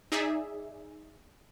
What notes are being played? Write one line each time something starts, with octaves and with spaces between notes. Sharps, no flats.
D#4 G#4 D5 E5